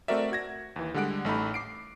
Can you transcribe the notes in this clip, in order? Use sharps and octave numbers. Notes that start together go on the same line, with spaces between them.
A3 C4 F#4 A#4 D5 E5
F#4 G#6 A#6
D#2 E3
D3 G3 G#3 F#5 F#6 D7
A1 A3 D#4 B5
D6 C7 D7